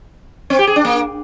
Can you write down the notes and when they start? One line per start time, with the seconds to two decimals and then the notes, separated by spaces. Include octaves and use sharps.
0.50 C4
0.59 G4
0.67 G#4
0.76 D4
0.85 A#3